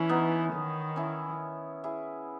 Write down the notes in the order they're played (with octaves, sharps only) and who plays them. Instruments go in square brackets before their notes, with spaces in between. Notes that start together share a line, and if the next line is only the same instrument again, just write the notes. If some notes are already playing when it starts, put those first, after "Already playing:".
Already playing: [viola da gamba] E3 [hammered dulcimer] C#4
[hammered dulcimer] B3 D#4
[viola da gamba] D#3
[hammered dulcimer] C#4 E4
E4 G#4